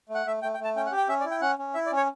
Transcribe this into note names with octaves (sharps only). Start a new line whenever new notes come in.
A3
F#5
A3 E5
A3 G5
G5
A3
A5
C#4 G5
F#5
G4
G5
C#4 E5
D5
E4
G5
C#4 F#5
C#4
E4 E5
D5
C#4
C#5